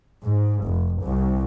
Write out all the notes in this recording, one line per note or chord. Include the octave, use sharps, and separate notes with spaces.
G#2
F1
C2